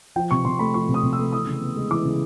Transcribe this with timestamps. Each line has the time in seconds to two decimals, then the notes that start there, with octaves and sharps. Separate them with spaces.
0.16 F3 G5
0.31 C3 C#6
0.45 C3 C6
0.59 A3 B5
0.74 F3 C#6
0.89 C3
0.94 D#6
1.03 C3
1.13 E6
1.19 A3
1.32 E3 D#6
1.47 C#3
1.61 B3
1.77 G#3
1.90 E3 D6
2.05 C#3